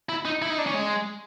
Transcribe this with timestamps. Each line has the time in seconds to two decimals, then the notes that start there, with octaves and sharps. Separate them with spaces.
0.09 E4
0.25 D#4
0.42 E4
0.50 D#4
0.58 D4
0.67 C#4
0.74 G#3